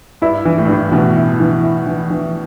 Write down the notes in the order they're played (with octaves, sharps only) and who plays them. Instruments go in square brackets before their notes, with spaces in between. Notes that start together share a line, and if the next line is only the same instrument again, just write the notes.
[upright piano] G2 [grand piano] E4
[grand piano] E3
[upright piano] A2
G2
[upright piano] A2 [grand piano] E3
[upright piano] B2 [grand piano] E3
[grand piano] E4
E3
E4
E3
E3